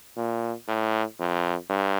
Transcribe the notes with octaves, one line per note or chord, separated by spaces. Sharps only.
A#2
A2
F2
G2